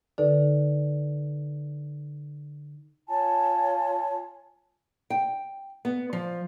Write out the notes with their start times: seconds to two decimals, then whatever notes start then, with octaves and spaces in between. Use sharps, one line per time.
0.18 D3 D#4 A4 B4 D5
3.08 F4 C#5 G#5 A5
5.10 G5
5.85 B3
6.13 F3